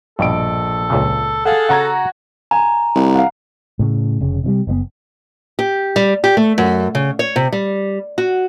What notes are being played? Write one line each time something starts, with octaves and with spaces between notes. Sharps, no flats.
A#1 G2 B2 A4 D#5 D7
C#2 A#2 C#3
G#4 A4 F5 F#5
C#3 F#4 C#5 F#5 A#5 G#6
G#5 A#5
C2
F5 F#5
A2 C#3
F1 C#3
C3 E3 G3
F#1 A2 B3
G4
G3
G4
A3
F#2
C#3
C#5
C3
G3
F#4